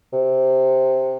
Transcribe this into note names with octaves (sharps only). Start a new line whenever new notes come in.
C3